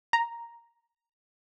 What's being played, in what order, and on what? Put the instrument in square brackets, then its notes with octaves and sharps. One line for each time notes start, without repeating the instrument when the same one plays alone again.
[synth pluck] A#5